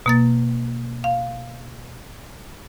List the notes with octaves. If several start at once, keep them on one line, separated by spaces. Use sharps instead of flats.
B2 A#3 A6
F5